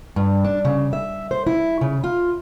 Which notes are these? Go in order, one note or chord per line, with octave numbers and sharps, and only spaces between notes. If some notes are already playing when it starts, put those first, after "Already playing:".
G2
D4
C#3
E5
C5
E4
C#3
F4